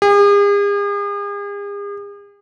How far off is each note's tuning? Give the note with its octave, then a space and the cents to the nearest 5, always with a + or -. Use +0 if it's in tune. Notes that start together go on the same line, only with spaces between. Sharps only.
G#4 -45